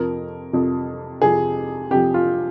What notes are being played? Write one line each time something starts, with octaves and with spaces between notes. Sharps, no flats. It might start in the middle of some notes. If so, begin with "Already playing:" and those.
Already playing: F2 C3 F3 A#4
F2 C3 F3
F2 C3 F3 G#4
F2 C3 F3 G4
F4